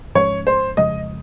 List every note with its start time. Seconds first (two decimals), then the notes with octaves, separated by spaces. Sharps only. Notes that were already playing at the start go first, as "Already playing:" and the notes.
0.15 G#2 F3 G#3 C#4 C#5
0.47 C5
0.77 F2 C#3 F3 G#3 D#5